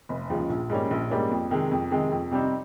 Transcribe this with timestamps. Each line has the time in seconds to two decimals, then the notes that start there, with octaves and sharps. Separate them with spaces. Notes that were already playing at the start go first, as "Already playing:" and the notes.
0.09 F1
0.29 D#2 C#3 F3 G#3
0.49 A#1
0.70 G#2 G3 A#3 C#4
0.91 A#1
1.10 G#2 G3 A#3 C#4
1.31 F2
1.51 C3 D#3 G#3
1.71 F2
1.91 C3 D#3 G#3
2.12 F2
2.31 C3 G3 C4 D#4